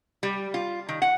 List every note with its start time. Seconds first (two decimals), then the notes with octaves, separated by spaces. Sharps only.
0.23 G3
0.54 F4
0.89 D#3
1.02 F#5